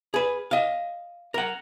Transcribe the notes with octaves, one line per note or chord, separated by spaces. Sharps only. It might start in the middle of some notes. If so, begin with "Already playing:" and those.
G#4 B4
D#5 F5
A#4 F#5